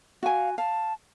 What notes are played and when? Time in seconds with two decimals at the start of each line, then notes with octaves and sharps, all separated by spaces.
0.23 F#4 F5 G#5
0.58 F5 A5